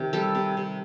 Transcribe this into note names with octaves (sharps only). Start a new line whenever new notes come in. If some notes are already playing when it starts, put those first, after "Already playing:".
Already playing: C3 D#3
G3 A4
C3
C3